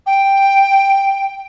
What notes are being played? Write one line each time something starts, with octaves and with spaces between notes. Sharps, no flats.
G5